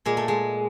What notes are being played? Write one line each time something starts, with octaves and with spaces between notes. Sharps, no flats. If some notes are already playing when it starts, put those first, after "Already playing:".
A#2 G#3
A3
G#3